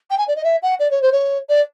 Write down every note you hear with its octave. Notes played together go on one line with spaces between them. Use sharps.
G5
G#5
D5
D#5
E5
F#5
D5
C#5
C5
C#5
D5